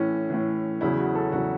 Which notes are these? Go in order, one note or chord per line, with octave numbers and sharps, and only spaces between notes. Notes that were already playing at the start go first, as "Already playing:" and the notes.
Already playing: A2 E3 C#4
A2 E3
E2 C#3 F#3 E4
F#4
A4
E2 C#3 F#3 F#4